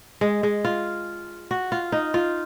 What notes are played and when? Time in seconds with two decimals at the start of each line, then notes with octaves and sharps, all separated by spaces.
0.21 G#3
0.43 G#3
0.65 F4
1.51 F#4
1.72 F4
1.92 D#4
2.14 F4